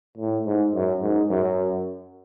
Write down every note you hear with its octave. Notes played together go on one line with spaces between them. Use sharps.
A2
G#2
F#2
G#2
F#2